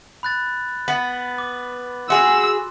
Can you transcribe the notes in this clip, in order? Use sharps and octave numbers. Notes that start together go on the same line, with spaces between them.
B5 F#6 A6
B3 F#7
D6
F#4 G#4 C6 E6